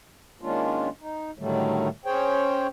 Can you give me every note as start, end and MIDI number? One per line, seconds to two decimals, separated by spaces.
0.41 0.89 51
0.41 0.89 56
0.41 0.89 58
0.41 0.89 61
0.41 0.89 62
0.41 0.89 65
1.00 1.31 63
1.39 1.88 45
1.39 1.88 50
1.39 1.88 51
1.39 1.88 54
1.39 1.88 55
1.39 1.88 57
2.05 2.67 61
2.05 2.67 68
2.05 2.67 72
2.05 2.67 73
2.05 2.67 79